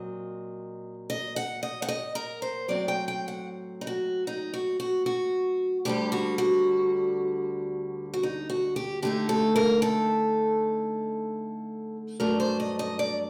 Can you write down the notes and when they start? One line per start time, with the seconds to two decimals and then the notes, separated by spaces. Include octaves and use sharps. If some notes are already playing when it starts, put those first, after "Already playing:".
Already playing: A#2 F#3 C4 D#5
1.10 D#5
1.36 F#5
1.63 D#5
1.82 F#5
1.88 D#5
2.15 A#4
2.42 C5
2.68 A2 F#3 C4 D5
2.88 G5
3.08 G5
3.28 F#5
3.81 D#4
3.87 F#4
4.27 D#4
4.54 F#4
4.80 F#4
5.06 F#4
5.85 D2 D3 G3 G4
6.12 F#4
6.38 F#4
8.14 F#4
8.23 D#4
8.50 F#4
8.76 G4
9.02 D3 A3 D#4 G4
9.29 A4
9.56 A#4
9.82 A4
12.20 G2 F#3 A3 D4 A#4
12.40 C5
12.60 D#5
12.79 D#5
12.99 D5